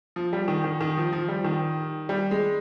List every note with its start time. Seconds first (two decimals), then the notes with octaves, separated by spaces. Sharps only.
0.16 F3
0.33 G3
0.48 D#3
0.64 D#3
0.81 D#3
0.97 F3
1.13 F3
1.28 G3
1.44 D#3
2.09 G3
2.31 G#3